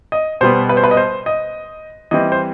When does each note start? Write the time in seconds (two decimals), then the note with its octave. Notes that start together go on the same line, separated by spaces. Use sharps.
0.12 D#5
0.41 B2 G3 B3 C5
0.69 B4
0.77 C5
0.84 B4
0.91 D#5
0.97 C5
1.26 D#5
2.11 E3 G3 C4 D#5
2.32 C5